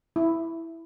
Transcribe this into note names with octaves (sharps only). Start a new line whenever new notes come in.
E4